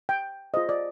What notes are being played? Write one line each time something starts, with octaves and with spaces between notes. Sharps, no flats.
G5
F4 G#4 C5 D#5
D5